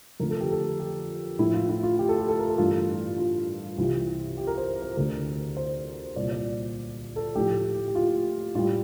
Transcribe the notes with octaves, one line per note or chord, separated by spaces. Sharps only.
F2 D3 F3 A3 A#4
A4
G4
A4
G4
A2 F3 A3 E4
F4
E4
F4
G4
A4
G4
A4
A#4
A4
G2 E3 A3 F4
F4
C2 C3 E3 F4
G4
A#4
C5
C5
D2 D3 A3 A#4
C5
C2 A#2 G3 D5
D5
A4
A2 F3 A3 G4
G4
F4
A2 G3 F4